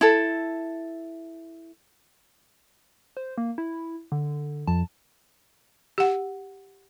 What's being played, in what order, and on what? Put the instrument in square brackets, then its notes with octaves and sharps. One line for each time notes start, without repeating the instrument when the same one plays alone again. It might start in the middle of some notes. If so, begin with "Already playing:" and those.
[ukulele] E4 A4
[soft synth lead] C5
A#3
E4
D3
[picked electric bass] F2 [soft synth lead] A5
[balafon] G4 F#5